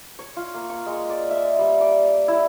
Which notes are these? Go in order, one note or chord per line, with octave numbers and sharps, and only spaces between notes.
C#5
F4
A#3
C#6
G#3
D5
E5
G3
D6
E4